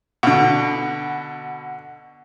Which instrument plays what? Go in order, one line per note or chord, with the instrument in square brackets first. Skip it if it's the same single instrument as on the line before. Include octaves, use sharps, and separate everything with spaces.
[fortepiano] B2 D3